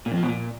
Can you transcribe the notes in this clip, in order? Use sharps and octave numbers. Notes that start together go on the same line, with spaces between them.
A#2
F2
F3
B2
A#2